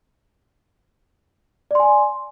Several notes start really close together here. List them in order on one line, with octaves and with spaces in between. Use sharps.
D5 C6 G#5